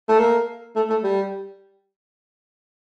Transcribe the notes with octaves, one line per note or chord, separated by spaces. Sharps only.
A3
A#3
A3
A3
G3